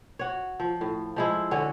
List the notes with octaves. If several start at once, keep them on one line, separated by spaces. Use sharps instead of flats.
F#4 C#5
F3
A2
F3 G#3 E4
D3 C#4 F#4 C#5